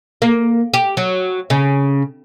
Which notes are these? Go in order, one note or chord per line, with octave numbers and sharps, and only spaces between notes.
A#3
G4
F#3
C#3